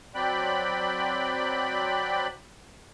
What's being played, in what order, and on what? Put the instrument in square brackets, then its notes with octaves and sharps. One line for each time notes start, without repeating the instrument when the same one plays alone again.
[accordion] F#3 C4 D5 G5 B5 F#6